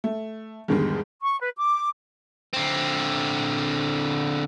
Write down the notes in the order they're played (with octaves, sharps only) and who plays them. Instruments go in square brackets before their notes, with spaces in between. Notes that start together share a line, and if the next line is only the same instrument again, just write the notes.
[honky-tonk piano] A3
E2 G#2 D3 D#3 G3 G#3
[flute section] C#6
B4
D6
[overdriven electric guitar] D3 C4